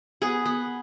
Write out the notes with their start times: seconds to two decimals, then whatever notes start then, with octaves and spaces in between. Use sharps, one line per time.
0.22 B3 G#4
0.46 B3